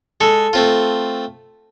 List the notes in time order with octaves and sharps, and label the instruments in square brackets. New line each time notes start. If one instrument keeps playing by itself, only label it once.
[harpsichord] G#3 [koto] A4
[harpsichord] A3 C4 F4